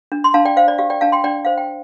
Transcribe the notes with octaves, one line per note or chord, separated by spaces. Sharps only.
D4
C6
D4 F5 A5
D5 G5
C5 F5
D5
G4 F5
D5 G5
D4 F5 A5
G5 C6
D4 D5 G5
C5 F5
G5